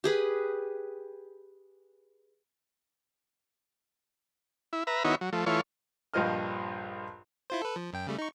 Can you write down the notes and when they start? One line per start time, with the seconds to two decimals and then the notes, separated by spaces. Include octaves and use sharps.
0.04 G4 G#4 B4
4.73 E4
4.87 B4 E5 A#5
5.04 D#3 B3 D#4 E4 F#4 C#5
5.21 F#3
5.33 F3 A3
5.46 E3 A3 F4 C#5
6.14 A#1 G2 F3 C5 D#5 F6
7.50 E4 F4 C5
7.62 A4 B4
7.76 F3
7.93 F#2 G5
8.07 C#3 G3 A3
8.18 D#4 C#6